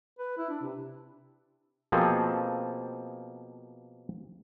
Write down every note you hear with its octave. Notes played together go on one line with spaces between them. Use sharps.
B4
E4
D4
C3
B2 F3 A#3 C4 G#4 A4